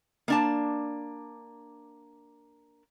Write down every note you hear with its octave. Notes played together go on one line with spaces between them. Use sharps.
A#3 D4 A5